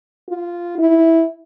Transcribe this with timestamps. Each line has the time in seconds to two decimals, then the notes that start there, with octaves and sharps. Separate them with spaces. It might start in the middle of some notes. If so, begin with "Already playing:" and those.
0.29 F4
0.79 E4